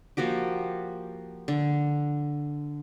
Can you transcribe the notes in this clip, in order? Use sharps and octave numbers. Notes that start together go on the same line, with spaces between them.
F3 A#3 F#4 G4
D3